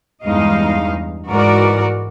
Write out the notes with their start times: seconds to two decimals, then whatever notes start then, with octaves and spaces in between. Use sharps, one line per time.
0.25 E2 G2 G#3 D#4 D#5 F5
1.30 G#2 E3 F#4 A#4 D5